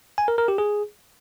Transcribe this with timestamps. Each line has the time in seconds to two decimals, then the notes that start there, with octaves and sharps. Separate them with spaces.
0.18 G#5
0.28 A#4
0.38 A#4
0.48 G4
0.58 G#4